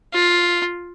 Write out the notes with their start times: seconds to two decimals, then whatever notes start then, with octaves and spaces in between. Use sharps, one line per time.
0.13 F4